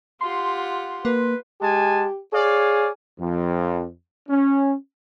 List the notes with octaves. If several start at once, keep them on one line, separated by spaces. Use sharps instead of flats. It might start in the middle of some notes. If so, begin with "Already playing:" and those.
F4 G4 F#5 C6
A#3 B4
G#3 G4 G#5 A5
G#4 C#5 D5 F5
F2
C#4